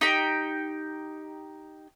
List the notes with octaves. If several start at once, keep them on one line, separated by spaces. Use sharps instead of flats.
D#4 G4 G5